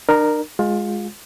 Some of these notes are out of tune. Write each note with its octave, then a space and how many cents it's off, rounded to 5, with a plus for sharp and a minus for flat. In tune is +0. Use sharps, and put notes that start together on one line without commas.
D4 +45 A#4 +0
G#3 +0 F4 +25